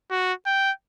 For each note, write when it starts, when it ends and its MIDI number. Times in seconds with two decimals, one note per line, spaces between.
0.11 0.33 66
0.46 0.71 79